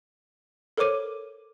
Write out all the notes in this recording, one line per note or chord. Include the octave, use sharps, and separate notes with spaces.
A4 A#4 C5 C#5 D6 D#7